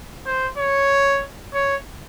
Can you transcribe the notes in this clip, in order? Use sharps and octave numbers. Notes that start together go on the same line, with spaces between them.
C5
C#5
C#5